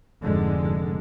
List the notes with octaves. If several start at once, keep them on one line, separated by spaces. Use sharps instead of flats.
F1 G#2 D3 G#3